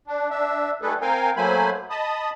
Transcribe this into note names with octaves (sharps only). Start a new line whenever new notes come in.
D4
D4 E5
D#3 G3 A3 G#4 A4 B4
C4 A#4 F5 G5 G#5
F#3 A3 A#3 C5 G#5 B5
D#5 A5 B5 D#6